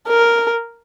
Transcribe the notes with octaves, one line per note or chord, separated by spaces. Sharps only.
A#4